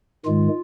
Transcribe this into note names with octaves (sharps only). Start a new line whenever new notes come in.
G#2 D#3 G#3 F4